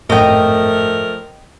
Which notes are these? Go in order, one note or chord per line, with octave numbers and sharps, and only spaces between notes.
G#1 F#2 A2 F3 A3 A#4 D#5 G5